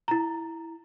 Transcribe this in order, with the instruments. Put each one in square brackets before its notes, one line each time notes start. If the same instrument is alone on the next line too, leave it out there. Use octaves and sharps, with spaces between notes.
[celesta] E4 A#5